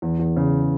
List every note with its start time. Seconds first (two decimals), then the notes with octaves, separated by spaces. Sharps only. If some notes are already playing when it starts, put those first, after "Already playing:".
0.02 E2
0.19 E2
0.36 C#3